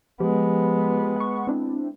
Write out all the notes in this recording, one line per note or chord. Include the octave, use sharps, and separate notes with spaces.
F3 G#3 B3 G4
F#5 C#6
C4 D4 E4